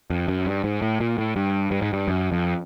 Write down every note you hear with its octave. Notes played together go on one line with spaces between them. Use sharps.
F2
F#2
G2
G#2
A2
A#2
A2
G2
G2
G#2
G2
F#2
F2